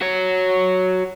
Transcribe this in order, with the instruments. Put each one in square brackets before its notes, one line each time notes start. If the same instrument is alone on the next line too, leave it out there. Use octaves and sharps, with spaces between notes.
[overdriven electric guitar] F#4 C#5